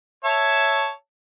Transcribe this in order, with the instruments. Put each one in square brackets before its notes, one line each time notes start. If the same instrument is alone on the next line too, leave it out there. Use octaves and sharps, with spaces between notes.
[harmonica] C#5 E5 A5